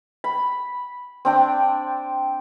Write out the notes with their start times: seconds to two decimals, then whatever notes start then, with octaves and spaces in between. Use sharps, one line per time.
0.24 B5
1.25 C4 D4 G5